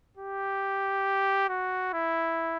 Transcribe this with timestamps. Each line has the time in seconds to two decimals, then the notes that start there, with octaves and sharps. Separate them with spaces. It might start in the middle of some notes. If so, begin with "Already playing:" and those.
0.17 G4
1.49 F#4
1.94 E4